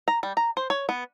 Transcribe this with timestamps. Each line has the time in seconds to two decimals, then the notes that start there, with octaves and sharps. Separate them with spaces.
0.08 A#5
0.23 G3
0.37 A#5
0.57 C5
0.70 C#5
0.89 B3